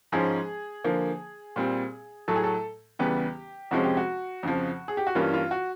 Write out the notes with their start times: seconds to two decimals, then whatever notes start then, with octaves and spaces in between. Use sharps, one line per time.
0.12 G#2 F3 G#3 C#4 G#4
0.84 D3 F3 A#3
1.56 A#2 G3 C4
2.28 A2 F#3 A3 A4
2.36 G#4
2.44 A4
2.99 E2 C#3 E3 G3 B3 G4
3.71 F2 C3 F3 G#3 C#4 F#4
3.84 G4
3.97 F#4
4.43 F2 C#3 F3
4.88 G#4
4.97 G4
5.07 F#4
5.15 G2 E3 G3 A#3 C#4 F4
5.33 F4
5.51 F#4